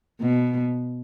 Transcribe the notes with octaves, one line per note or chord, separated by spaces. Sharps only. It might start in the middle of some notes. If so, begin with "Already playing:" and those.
B2